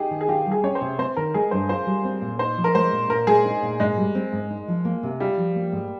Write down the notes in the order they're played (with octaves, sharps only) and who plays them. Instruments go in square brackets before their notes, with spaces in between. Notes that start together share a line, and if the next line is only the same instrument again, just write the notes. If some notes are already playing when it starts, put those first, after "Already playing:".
Already playing: [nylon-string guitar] D#4 [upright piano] G4 G#4
[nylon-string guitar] D#3
[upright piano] G#4
[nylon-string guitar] F4 [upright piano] G4
[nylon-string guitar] G3
[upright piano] G#4
[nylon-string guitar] C#4 [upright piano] C#5
[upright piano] C5
[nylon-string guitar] C3
[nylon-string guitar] C4 [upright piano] C5
[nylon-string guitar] D#3 [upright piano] A#4
[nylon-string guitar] G#3 [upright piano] G#4
[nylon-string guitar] G2 [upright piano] C5
[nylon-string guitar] F4 [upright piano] C5
[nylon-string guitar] G3
C4
A#2
[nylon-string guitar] D#4 [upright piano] C5
[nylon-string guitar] F3
[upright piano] A#4
[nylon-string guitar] G#3 [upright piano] C5
[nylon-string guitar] A#2
[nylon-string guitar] A#2 [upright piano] A#4
[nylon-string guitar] G#3 [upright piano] G#4
[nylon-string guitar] D#4
A#2
[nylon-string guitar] G#2 [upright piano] G#3
[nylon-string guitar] G3
C4
G#2
D#4
F3
A#3
C3
[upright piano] G3 [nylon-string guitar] F4
[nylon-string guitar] F3
A#3
G#2